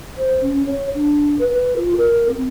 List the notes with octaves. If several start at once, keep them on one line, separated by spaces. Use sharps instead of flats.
C5
C#4
C#5
D4
B4
B4
F4
A#4
C4